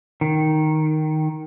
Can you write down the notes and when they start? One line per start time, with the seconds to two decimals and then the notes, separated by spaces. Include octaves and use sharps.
0.21 D#3